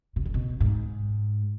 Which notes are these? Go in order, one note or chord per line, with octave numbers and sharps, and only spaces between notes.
B2
A#2
B2
G#2